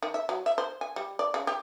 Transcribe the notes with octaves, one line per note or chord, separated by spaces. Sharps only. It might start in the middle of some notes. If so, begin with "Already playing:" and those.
D#3
E5
F#3
E5
C5
G#5
G3
D5
C#3
G4